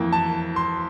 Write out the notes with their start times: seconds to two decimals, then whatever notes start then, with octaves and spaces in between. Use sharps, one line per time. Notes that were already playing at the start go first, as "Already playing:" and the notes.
Already playing: F2 E3 A#3
0.13 A5
0.56 C6